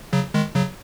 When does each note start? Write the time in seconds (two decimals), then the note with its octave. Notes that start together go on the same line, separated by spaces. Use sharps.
0.13 C#3 F#3
0.34 D#3 G#3
0.55 C#3 F#3